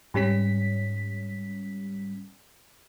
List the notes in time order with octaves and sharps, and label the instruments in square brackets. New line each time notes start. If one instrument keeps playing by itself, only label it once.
[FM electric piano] G#2 G3 C#4 B6